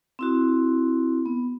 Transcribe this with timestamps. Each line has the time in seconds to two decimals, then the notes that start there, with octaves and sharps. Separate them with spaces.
0.19 C4 E4 F#4
1.26 B3